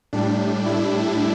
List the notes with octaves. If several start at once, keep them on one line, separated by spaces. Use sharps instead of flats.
A2 G3 D4
E4